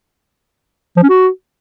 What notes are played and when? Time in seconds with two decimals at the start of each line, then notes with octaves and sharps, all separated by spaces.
0.97 F3
1.03 C#4
1.09 F#4